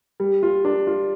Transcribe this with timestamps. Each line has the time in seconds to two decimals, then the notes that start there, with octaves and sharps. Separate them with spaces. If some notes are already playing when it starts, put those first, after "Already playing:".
0.20 G3
0.43 F4
0.65 D4
0.87 F4